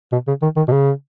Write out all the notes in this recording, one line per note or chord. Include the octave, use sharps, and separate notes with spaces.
B2
C#3
D#3
D#3
B2
C#3